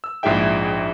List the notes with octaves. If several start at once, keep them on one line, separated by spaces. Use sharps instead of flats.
E6
A#1 G#2 E4 G#4 E5 G5